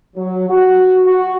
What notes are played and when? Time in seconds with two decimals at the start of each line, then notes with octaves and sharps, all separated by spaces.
0.16 F#3
0.48 F#4
1.04 F#4